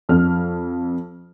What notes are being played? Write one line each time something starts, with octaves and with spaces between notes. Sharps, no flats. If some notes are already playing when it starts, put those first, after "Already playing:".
F2 F6